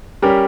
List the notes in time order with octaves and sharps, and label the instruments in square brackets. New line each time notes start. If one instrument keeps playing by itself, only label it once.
[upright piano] G3 C#4 G4 A#4